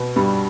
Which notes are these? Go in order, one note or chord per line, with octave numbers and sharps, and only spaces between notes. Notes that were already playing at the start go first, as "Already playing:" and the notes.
Already playing: B2 B3
G2 G3